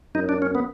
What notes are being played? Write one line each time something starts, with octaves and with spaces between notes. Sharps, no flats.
F#2 D#4
D4
C#4
B3